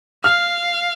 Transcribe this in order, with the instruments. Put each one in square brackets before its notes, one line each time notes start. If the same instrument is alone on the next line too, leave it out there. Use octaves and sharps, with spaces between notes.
[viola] F5 [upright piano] F6